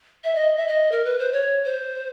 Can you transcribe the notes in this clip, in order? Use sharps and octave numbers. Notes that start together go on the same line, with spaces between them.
E5
D#5
E5
D#5
A#4
B4
C5
C#5
C5